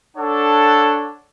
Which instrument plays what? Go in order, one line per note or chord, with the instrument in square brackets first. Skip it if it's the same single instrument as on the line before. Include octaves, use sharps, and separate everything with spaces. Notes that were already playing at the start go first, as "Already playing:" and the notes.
[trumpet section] D4 A4 C#5 F#5